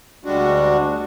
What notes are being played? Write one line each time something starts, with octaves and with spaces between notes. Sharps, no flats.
D2 G3 G#3 D4 F#4